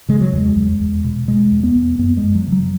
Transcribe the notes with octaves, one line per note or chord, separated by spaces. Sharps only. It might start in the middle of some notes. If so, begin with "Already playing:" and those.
C#3 G#3
F#3
E2
G#3
E2
E2
B2
B2 G#3
E2
B3
E2
F#2 B3
G#3
F#2
F#3
C#3
F#3